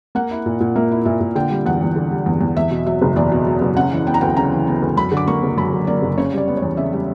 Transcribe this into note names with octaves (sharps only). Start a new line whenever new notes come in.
A#3 F#5
E4
A#2
A#2
A#3 E5
E4
A#2 E5
A#2
D3 G5
G3
E2 F#5
E2
D3
G3
E2
E2
E2 E5
B2
F#3 E5
F#1
E2 D5
B2
F#3
F#1
C#3 F#5
E3
B3 G5
A#5
D2 G5
C#3 A#5
E3
B3
D2
F#2 B5
D3
D6
A#3 C#6
F#1
F#2 B5
D3
A#3 D5
F#1
C#3 C#5
G3 D5
B3
C#5
E2
C#3 E5
G3